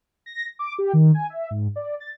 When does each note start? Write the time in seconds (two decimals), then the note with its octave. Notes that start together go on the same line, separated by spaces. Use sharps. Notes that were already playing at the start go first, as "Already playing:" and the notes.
0.26 A#6
0.59 D6
0.78 G4
0.93 D#3
1.14 G#5
1.30 E5
1.51 G#2
1.76 D5
2.00 A6